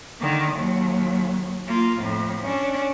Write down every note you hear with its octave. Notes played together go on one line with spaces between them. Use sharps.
D3 D#3
D#2 F#3
A#3 F4
F2 A2
C#4 D4